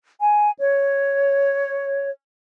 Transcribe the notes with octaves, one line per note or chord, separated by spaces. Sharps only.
G#5
C#5